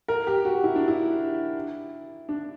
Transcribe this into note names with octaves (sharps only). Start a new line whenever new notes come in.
A#4
G4
F#4
E4
D4
E4
D4